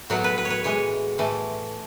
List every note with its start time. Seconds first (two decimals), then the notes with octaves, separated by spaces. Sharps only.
0.10 A2 F#3 B3 F#4
0.24 B4
0.38 B4
0.45 C#5
0.50 B4
0.64 A2 E3 G#3 C#5
1.18 A2 E3 A3